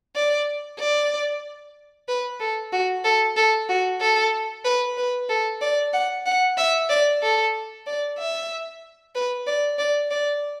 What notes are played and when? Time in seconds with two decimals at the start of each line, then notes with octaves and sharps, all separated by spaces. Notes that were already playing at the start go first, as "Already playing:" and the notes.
0.16 D5
0.79 D5
2.08 B4
2.40 A4
2.73 F#4
3.04 A4
3.37 A4
3.69 F#4
4.01 A4
4.65 B4
4.97 B4
5.29 A4
5.61 D5
5.94 F#5
6.26 F#5
6.58 E5
6.90 D5
7.22 A4
7.87 D5
8.18 E5
9.15 B4
9.47 D5
9.79 D5
10.11 D5